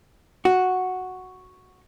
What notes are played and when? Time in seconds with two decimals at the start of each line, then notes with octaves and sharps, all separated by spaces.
0.45 F#4